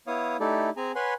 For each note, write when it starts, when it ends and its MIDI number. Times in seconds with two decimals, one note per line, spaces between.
0.07 0.37 59
0.07 0.37 64
0.07 0.37 73
0.07 0.37 77
0.07 0.37 87
0.40 0.70 57
0.40 0.70 63
0.40 0.70 64
0.40 0.70 67
0.40 0.70 69
0.40 0.70 74
0.77 0.92 60
0.77 0.92 68
0.77 0.92 80
0.77 0.92 82
0.96 1.14 71
0.96 1.14 73
0.96 1.14 78
0.96 1.14 80
0.96 1.14 83
0.96 1.14 84